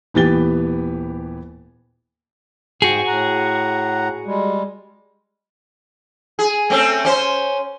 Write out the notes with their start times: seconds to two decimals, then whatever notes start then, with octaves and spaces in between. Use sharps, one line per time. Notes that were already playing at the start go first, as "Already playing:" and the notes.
0.14 D#1 E3 B3 G4 A6 G7
2.82 G#2 F#4 G#4 G5
3.07 A2 F#5 A#5
4.26 G3 G#3
6.39 G#4
6.70 A3 C4 C#4
7.05 C#4 C5